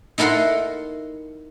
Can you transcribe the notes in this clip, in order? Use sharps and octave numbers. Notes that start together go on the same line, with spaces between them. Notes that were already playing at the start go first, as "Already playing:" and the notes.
D#4 E4 A4 A#4 F#5 C6